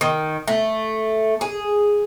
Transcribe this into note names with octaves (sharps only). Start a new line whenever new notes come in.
D#3
A3
G#4